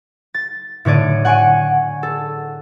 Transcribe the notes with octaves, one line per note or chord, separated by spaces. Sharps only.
A6
A2 D3 C#5 D5 D#7
F#5 G#5 C#6 D7 D#7
A4